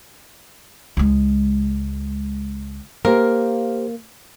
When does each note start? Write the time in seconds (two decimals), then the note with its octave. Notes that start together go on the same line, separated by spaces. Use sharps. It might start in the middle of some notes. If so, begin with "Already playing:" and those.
0.97 C#2 G#3
3.05 A#3 G4 A#4 C5 F5